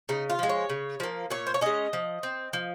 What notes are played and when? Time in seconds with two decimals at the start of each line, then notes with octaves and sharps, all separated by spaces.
0.09 C#3 D#4
0.30 F4
0.39 F3 G#3
0.49 C#5
0.70 C#3
1.00 F3 A#3
1.30 A#2 C#5
1.47 C5
1.54 C#5
1.61 G#3 C#4 D#5
1.93 F3
2.23 C4
2.53 F3